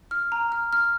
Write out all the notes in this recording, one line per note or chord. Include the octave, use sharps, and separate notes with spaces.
F6
A#5
F6
F6